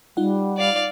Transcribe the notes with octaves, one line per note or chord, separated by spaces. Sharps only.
G3 D#4 F4 F#5
D5 F5